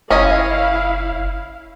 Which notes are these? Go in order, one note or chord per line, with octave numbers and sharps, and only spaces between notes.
F#1 C#4 E4 D#5 F5 G#5